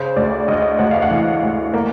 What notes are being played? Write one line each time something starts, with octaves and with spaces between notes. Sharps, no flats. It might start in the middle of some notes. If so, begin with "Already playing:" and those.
Already playing: C#3 C5
D2 D5
D2 D#5
D2 F#5
F5
F#5
E3
D2
A#3